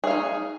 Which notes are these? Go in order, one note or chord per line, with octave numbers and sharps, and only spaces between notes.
D#4 G#4 F5